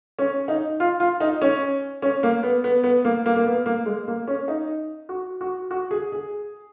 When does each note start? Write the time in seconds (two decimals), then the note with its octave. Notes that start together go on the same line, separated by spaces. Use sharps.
0.19 C#4
0.48 D#4
0.80 F4
1.00 F4
1.21 D#4
1.42 C#4
2.02 C#4
2.23 A#3
2.43 B3
2.64 B3
2.84 B3
3.05 A#3
3.26 A#3
3.36 A#3
3.46 B3
3.66 A#3
3.86 G#3
4.08 A#3
4.28 C#4
4.48 D#4
5.09 F#4
5.41 F#4
5.71 F#4
5.91 G#4
6.12 G#4